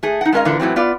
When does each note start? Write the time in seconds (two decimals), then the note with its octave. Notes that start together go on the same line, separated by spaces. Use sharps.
0.03 A3 G#4
0.21 D#4 F#5
0.32 G#3 A3 C#4 A#4 D#5 F5
0.45 A#2 D3 E3 A#3
0.60 A2 E3 F#3 C4
0.76 B3 F4 D5